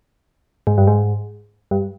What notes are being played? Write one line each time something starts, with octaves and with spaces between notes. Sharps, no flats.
G#2
G2
G#2
G2